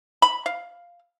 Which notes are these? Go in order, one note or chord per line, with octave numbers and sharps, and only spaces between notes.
B5
F5